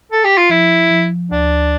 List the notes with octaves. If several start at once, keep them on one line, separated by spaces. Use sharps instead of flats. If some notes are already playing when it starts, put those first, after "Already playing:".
A4
G4
F4
F3 E4
F3
D2 D4